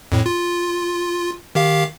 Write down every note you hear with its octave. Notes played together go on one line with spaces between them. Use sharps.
F2 A2
F4
D#3 G4 F5